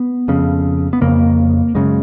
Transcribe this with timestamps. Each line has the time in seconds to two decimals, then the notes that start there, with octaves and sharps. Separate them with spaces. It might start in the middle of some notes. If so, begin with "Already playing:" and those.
Already playing: B3
0.28 F2 C#3
0.93 B3
1.01 F2 C#3 A#3
1.75 F#2 C#3 G#3